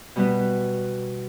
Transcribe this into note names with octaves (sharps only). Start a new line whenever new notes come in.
B2 G3 B3